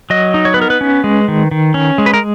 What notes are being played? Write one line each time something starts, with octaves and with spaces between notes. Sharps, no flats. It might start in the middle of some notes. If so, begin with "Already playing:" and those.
F#3 D#5
D#4
C#5
B4
B3 A#4
B4
C#4
G#3
D#3
D#3
C#4
G#3
B4
A#4